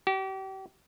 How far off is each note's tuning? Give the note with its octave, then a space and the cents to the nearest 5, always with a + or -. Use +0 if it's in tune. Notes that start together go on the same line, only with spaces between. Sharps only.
G4 -35